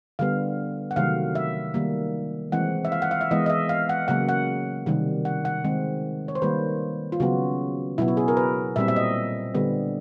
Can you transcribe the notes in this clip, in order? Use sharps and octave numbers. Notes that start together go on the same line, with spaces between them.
D3 G3 B3 F5
F#5
C3 D#3 F#3 A3 F5
E5
D#3 G3 A#3
E3 G#3 C4 F#5
E5
F5
F#5
F5
E5
E3 G#3 B3 D#5
D#5
E5
F5
F#5
C#3 F#3 A#3 F#5
F#5
C3 D#3 G3
F#5
F#5
D#3 G#3 C4
C#5
C5
D#3 G3 A#3 B4
F4
C#3 F#3 B3 F#4
B2 F#3 B3 E4
F#4
G#4
A#4
B4
A#2 G3 C4 E5
E5
D#5
D3 G3 B3